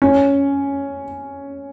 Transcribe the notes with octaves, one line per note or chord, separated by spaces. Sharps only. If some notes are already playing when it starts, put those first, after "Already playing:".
C#4